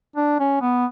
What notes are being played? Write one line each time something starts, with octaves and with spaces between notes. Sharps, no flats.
D4
C#4
B3